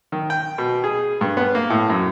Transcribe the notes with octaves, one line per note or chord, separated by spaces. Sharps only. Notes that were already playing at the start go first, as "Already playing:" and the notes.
D#3
G5
B2
G#4
G2
B3
A#3
A2
F#2